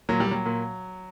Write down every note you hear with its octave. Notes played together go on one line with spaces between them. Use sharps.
A#2 F#3
G3
A#2 F#3
A#2